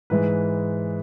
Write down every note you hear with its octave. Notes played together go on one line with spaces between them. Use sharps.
G#2 E3 G#3 B4